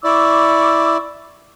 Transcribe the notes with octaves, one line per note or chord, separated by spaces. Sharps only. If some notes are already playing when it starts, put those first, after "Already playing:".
E4 D5 C#6 D6 E6